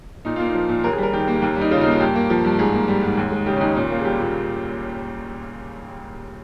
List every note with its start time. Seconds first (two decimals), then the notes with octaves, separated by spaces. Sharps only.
0.25 A#2 D#4
0.36 A#3 F4
0.47 D#4
0.55 F3
0.69 A#2
0.84 D#2 A#4
0.93 G#4
0.98 G3
1.03 A#4
1.13 D#3 G4
1.28 A#3
1.42 D#2
1.56 G3 D#4
1.71 C#3 F4
1.81 D#4
1.86 A#3
1.91 F4
2.00 G2 G4
2.15 A#3
2.30 F3
2.44 G2
2.59 G#2 G#4
2.73 A#3
2.88 G3
3.03 G#2
3.17 D#2
3.32 G#3
3.46 C#3 G4
3.56 C#4
3.60 D#2 D#4
3.75 A#2 C#4
3.90 A#3 F4
3.99 G#4
4.05 G3 G4
4.20 A#2